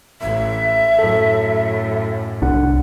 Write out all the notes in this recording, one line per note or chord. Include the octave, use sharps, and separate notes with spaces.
A1 E5
F#2 A2 A4
C2 D4 F#5